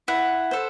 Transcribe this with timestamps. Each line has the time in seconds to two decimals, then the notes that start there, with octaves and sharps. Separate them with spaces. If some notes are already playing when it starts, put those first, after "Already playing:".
0.08 E4 F#5
0.51 A4 C5